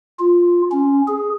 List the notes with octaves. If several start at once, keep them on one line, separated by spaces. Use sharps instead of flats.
F4
C#4
G#4